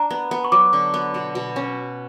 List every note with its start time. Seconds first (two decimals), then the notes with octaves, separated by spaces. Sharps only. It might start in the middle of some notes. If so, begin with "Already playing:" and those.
Already playing: D4 A#5
0.10 B3
0.31 B3
0.44 C#6
0.52 F#3 D6
0.73 D3
0.94 B3
1.14 B2
1.35 B2
1.56 C#4